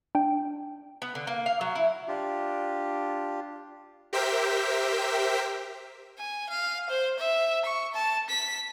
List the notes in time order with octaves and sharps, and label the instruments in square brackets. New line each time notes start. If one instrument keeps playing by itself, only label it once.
[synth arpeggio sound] D4 G5
[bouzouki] B3
D3
A#3
F5
F#3
E4
[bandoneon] D4 F4 G4
[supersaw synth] G4 A#4 C5 E5 G5 B6
[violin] G#5
F5
C5
E5
C#6
A5
B6